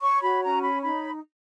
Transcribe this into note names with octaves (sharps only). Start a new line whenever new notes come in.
C#5 C#6
F#4 B5
C#4 A#5
C#5 B5
D#4 B5